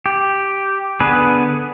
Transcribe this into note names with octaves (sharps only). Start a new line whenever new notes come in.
G4
D3 B3 G#4 B4